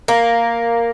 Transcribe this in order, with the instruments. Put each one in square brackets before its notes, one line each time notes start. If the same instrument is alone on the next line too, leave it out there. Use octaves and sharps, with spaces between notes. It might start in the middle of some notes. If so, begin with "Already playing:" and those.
[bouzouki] A#3